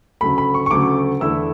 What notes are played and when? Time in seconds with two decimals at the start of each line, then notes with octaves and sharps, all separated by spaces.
0.21 D2 C#3 F#3 A3 B5
0.38 B5
0.54 C#6
0.66 C#6
0.71 D2 C#3 F#3 A3 D6
1.20 E2 D3 A3 E4 E6